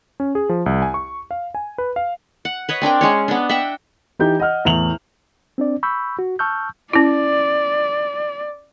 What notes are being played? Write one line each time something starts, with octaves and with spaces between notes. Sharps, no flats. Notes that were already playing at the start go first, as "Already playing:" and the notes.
C#4
G#4
F3
C2
G#5
C#6
F5
G#5
B4
F5
F#5
B4 C#5 D#5
C4 D4 A#4 G5
G#3 C#4 C#5
B3 D4
E5 F#5 G5 A#5
E3 D#4 G4 G6
D#5 F#5 F6
E2 A2 F7 F#7
C4 D4 D5
B5 C#6 E6 G6
F#4
A5 C#6 E6 F6 G6
C#4 E4 D5